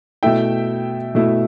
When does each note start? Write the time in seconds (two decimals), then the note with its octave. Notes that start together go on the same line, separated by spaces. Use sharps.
0.23 B2 A3 E4 E5 G5
1.15 B2 A3 E4